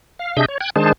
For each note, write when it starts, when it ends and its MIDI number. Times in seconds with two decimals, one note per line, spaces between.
0.19 0.36 77
0.37 0.46 48
0.37 0.46 62
0.37 0.46 68
0.37 0.46 75
0.37 0.46 76
0.37 0.46 91
0.48 0.58 73
0.61 0.70 79
0.61 0.70 90
0.61 0.70 92
0.76 0.92 51
0.76 0.92 56
0.76 0.92 62
0.76 0.92 68
0.76 0.92 72
0.76 0.92 81